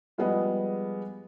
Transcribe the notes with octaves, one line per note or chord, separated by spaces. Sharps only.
F3 G3 G#3 B3 G#4 D#5